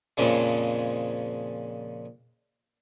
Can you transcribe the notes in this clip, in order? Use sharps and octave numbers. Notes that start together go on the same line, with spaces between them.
F2 A#2 C#3 G#3